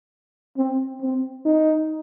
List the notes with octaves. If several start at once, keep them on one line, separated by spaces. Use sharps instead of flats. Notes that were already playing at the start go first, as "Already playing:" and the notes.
C4
C4
D#4